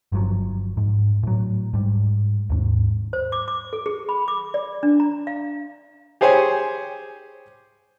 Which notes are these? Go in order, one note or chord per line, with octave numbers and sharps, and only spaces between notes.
G1 G2 F3 F#3
G#2
A2 F#3
G#2 G3
D#2 G#2
C5
D6
D6
A4
G#4
B5
D6
D5
D4
A#5
F5
G4 G#4 C5 C#5 G#5